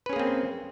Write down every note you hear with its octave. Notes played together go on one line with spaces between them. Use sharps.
A#3 C4 C#4 G#4 B4